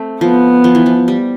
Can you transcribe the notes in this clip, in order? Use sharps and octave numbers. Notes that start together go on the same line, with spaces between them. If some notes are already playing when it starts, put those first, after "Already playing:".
Already playing: A3 C4
F3 B3
F3
E3
F3
G3